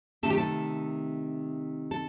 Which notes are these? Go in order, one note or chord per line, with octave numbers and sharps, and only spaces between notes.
C3 D#3 A3 A4
G4
A4
A4